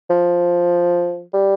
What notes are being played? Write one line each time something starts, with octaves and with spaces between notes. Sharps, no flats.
F3
G3